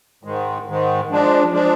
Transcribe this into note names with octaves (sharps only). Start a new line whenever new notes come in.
G#2 D#3 G#3
G#2 D#3 G#3
F3 G#3 D4
F3 G#3 D4